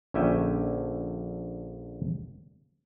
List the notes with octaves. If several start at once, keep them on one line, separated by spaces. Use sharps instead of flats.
A#1 D3 C#4 E5 G5 G#5